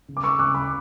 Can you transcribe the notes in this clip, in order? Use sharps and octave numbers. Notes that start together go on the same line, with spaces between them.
C#3
D6
C#6 E6
C#3 D6 F#6
B5 D6